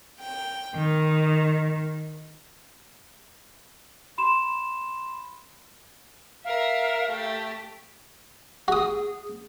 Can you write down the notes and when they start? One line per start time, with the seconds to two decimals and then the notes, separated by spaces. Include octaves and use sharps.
0.20 G5
0.75 D#3
4.18 B5 C6 E7
6.44 A#4 E5 F5
7.08 A3 G4
8.68 F#4 G#4 D#6